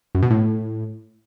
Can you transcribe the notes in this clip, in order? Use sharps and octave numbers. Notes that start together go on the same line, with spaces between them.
F#2
B2
A2